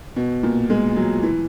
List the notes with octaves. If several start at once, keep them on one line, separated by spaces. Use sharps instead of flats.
B2
A#2
G#3
F#3
E3